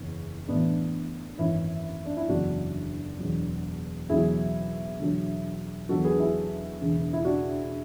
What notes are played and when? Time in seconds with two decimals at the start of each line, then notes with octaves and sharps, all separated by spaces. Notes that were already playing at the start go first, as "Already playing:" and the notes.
Already playing: F#1 E2 C#3 E3 C#4
0.48 A1 A2 E3 B3 D4
1.38 G#1 F#2 E3 C#4 E4
2.05 D4
2.17 E4
2.28 F#1 E2 D3 F#3 D4 F#4
3.19 E1 E2 B2 F#3
4.09 E1 E2 C#3 F#3 E4 G#4
5.00 E1 D2 D3 F#3
5.89 E2 D3 F#3 F#4 A4
6.04 G#4 B4
6.19 E4 G#4
6.80 E1 D2 C#3 E3
7.13 E4
7.24 D4 F#4